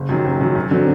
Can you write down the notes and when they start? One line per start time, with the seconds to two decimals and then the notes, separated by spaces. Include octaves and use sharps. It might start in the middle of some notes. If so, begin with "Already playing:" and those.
Already playing: F#1
0.09 F#2 D#3 F#3
0.24 F#1
0.41 F#2 D#3 F#3
0.55 F#2
0.71 D3 F#3 C4